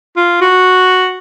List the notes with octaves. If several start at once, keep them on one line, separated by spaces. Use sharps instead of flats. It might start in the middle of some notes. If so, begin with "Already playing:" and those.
F4
F#4